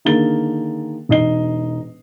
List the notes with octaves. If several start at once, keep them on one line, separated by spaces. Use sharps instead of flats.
D3 D#3 A#3 G#4 A6 G7
E1 D#4 D#5 C7 G7